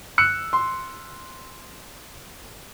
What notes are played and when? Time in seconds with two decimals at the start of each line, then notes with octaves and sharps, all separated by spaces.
0.18 E6 F#6 C#7
0.53 C6